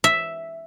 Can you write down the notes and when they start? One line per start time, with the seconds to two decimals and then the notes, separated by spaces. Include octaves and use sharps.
0.04 E5